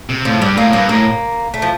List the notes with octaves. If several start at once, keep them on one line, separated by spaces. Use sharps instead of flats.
C3
A2 F3
G2 G3
A2 A#3
G2 A#3
A2 A#3
A3
F3